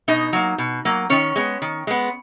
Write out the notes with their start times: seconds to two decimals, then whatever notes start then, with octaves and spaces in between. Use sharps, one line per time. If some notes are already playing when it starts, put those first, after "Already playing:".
0.08 B2 D#4 D#5
0.33 F#3 A#3
0.58 B2
0.85 F#3 A#3
1.10 D#3 C#4 C#5
1.36 G#3 B3
1.62 D#3
1.87 G#3 B3